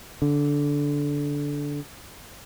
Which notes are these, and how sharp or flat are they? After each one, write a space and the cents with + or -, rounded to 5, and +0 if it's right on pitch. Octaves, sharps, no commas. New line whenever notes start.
D3 -15